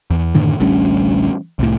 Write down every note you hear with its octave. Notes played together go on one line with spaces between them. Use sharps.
E2
F#2 A2 D3 D#3
A1 D2 G3 C#4
C2 A2